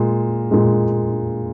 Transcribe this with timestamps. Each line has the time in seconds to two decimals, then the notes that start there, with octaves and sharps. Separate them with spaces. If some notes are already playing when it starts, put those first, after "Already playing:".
Already playing: A#2 G#3
0.51 A#2 G#3